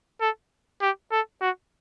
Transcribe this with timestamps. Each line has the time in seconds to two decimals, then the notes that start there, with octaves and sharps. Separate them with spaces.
0.21 A4
0.81 G4
1.11 A4
1.41 F#4